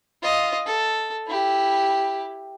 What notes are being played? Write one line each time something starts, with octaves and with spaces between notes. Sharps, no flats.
F4 D#5
A4
E4 G4